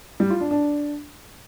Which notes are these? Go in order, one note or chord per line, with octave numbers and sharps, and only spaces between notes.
G3
F4
D4
D4